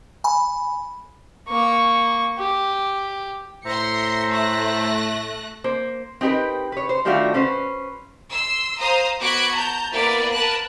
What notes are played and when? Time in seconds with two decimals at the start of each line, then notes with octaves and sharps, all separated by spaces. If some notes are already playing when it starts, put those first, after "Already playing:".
0.24 G#5 B5
1.49 A#3 C#6
2.38 G4
3.65 A2 C5 E5 A#5 C6 A#6 C#7
4.30 A3 F#6 A#6
5.64 A#3 C5
6.21 C4 D#4 G4 A#4 B4
6.72 B4 C#5
6.89 C5
7.05 D#3 G3 A3 D4 F4 F#4
7.34 C#4 B4 C5
8.30 C6 E6
8.79 C5 F5 A#5 D#6
9.19 B3 F#4 D6 F#6 G#6 B6
9.53 A5 A#5 G6
9.92 A#3 B3 E4 A#4 B4 D5
10.31 A#4 B4 A5 F#6